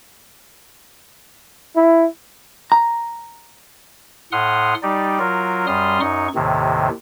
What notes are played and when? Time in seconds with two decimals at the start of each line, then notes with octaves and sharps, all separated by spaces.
1.76 E4
2.72 A#5
4.32 A2 F#5 C6 D#6 F6
4.83 G3 D#4 G4 D5
5.19 F#3 F4 A#4
5.67 F#2 G3 C6 D#6 F6
6.00 F#2 D#4 C#6
6.35 D#2 A2 C3 D#3